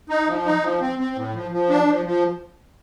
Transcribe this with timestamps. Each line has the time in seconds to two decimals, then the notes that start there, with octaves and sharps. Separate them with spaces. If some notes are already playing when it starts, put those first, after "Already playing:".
0.09 D#4
0.28 F3
0.45 D#4
0.63 F3
0.80 C4
0.99 C4
1.16 A2
1.34 F3
1.51 F3
1.70 D4
1.88 F3
2.05 F3